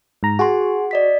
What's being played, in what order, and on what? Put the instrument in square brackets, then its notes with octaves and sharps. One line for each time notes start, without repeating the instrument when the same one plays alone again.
[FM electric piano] G#2 A#5
[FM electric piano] F#4 [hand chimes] G#4 G#5 C6
[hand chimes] D5 D#5 B6